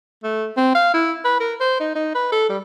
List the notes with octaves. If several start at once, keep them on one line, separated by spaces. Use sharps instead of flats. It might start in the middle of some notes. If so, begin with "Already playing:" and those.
A3
C4
F5
E4
B4
A#4
C5
D#4
D#4
B4
A4
G3